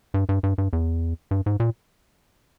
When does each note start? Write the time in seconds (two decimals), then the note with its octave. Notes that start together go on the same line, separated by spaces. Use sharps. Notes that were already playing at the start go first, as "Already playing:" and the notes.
0.14 G2
0.29 G2
0.43 G2
0.58 G2
0.73 E2
1.31 G2
1.46 G#2
1.60 A#2